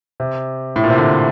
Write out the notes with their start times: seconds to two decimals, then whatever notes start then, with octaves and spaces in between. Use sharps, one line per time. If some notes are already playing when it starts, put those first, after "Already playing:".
0.20 C3
0.76 A2
0.84 A#2
0.90 C3
0.98 D3